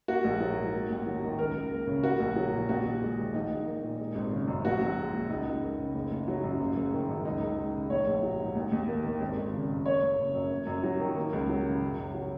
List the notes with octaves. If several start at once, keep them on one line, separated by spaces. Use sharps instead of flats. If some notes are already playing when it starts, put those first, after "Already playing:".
A#3 F#4
A#1
F#3
G#2
A#3
D#2
F#3
D#3
C#2 A#4
C#2
A#3
C#3
A#3 F#4
A#1
F#3
A#2
D#2 F#4
D#2
G#3
D#3
A#1 D#4
A#1
A#3
A#2
G#3
G#1
C#3
F#2
A#1 F#4
A#1
G#3
A#2
C#2 D#4
C#2
A#3
C#3
F#1
F#1
F#3
F#2
F#1
F#1
D#3
F#2
C#2 D#4
C#2
G#3
C#3
A#1 C#5
A#1
F#3
G#2
D#2
D#2
A#3
D#3
G#1
G#1
C#3
F#2
A#3 C#5
F#1
C#3
F#2
A#3
F#2
F#3
D#3
A#3
C#2
F#3
C#3
F#2
F#2
F#3